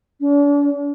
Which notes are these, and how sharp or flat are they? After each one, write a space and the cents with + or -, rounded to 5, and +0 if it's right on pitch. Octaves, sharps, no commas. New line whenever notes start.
D4 -40